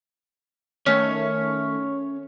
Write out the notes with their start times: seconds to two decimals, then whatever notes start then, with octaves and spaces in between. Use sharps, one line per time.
0.86 D#3 A3 C#4 C#5